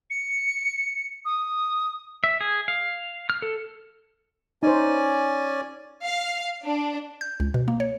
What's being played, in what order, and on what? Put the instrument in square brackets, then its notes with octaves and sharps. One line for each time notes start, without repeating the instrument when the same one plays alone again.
[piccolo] C#7
D#6
[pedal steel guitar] E5
G#4
F5
F6
A4
[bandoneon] C#4 D5 G#5 [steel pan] D#4 C5
[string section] F5
D4
[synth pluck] G6
C#2
B2
A#3
C#5